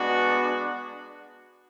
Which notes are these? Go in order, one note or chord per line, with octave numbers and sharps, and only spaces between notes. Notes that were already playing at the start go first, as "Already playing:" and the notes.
Already playing: G#3 B3 D4 F#4